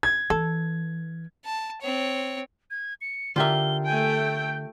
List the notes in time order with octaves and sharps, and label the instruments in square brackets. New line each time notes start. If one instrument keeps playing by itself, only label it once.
[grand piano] G#6
[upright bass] E3 [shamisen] A4
[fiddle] A5
C4 C#5
[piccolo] G#6
C#7
[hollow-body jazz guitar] D3 E5 [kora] F4 G4 A#4 [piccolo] G7
[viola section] A3 G5 [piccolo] G#5
[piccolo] G6